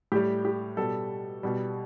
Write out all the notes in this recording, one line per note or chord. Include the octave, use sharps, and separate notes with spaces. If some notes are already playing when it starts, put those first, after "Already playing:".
A2 G3 G4
G4
B2 G3 A4
B2 G3